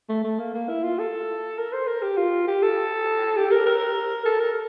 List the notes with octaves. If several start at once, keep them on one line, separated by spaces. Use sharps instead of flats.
A3
A3
A#3
A#3
E4
F4
A4
A#4
C5
A#4
G4
F4
G4
A4
G4
A#4
A#4
A4
A#4